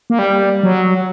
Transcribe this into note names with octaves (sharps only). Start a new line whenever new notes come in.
A#3
G3
F#3